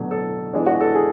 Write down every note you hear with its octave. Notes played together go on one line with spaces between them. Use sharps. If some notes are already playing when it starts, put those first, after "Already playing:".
Already playing: B2 F#3 A3 D4
A4
E3 G#3 B3 D4
F#4
A4
G#4